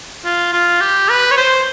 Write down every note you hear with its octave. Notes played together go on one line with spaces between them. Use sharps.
F4
F4
G4
B4
C#5
C5